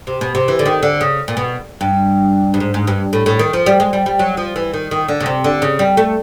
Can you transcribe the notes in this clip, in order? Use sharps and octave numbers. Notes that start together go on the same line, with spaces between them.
C3
B2
C3
E3
D3
D#3
D3
C#3
A#2
B2
G2
G2
G#2
G#2
G2
A2
A2
D#3
F3
G3
G#3
G3
G3
F#3
F3
E3
D#3
D#3
D3
C#3
C3
D3
C#3
G3
A3